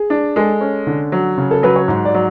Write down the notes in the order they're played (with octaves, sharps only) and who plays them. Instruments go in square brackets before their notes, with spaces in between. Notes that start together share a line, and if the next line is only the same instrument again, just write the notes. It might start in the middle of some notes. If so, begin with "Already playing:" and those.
Already playing: [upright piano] G#4
[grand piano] D4
[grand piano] G#3 [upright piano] A4
[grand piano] C#4
D3
F#3
C#3
[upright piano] A4
[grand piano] F#3 [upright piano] B4
[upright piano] C#5
[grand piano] G#2
[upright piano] D5
[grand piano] F#3